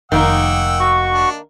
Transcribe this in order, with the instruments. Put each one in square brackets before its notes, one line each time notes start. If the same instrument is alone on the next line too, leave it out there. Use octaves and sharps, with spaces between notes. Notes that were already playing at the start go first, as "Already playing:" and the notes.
[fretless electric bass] F1 [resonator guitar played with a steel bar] D#3 A#3 D#4 [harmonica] F#5 G5 E6
[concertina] F#4 C#6
[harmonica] D4